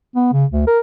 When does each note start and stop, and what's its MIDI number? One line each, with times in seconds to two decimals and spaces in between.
0.16 0.31 59
0.33 0.46 49
0.51 0.67 38
0.67 0.80 70